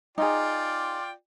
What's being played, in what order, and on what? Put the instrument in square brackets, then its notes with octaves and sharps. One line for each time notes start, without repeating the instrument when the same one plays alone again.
[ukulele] D#4 G#4 [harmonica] F4 D5 G5